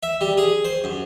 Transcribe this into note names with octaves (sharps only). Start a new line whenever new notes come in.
E5
G3
G#4
C5
F#2